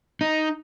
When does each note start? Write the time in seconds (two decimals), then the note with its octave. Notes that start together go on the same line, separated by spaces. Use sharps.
0.21 D#4